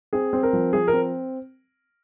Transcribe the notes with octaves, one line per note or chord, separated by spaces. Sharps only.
C4 G#4
C4
A#4
F3
F3 G#4
A#4
C4